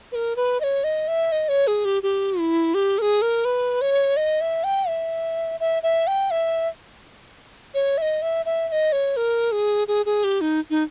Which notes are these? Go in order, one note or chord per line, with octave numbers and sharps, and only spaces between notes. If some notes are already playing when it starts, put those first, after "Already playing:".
B4
A#4
B4
D#5
C#5
D#5
E5
D#5
C#5
G#4
G4
G4
E4
G4
A#4
G#4
A#4
B4
C#5
D#5
E5
G5
E5
E5
E5
G5
E5
C#5
E5
D#5
E5
E5
E5
D#5
C#5
A#4
G#4
G#4
G#4
G4
D#4
D#4